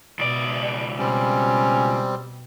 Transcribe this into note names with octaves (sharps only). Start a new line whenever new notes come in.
C#2 B2 D5
B2 G3 C4 C#4